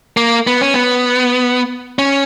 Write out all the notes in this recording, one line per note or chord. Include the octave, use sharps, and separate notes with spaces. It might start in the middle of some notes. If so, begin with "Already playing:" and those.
A#3
B3
C#4
B3
C#4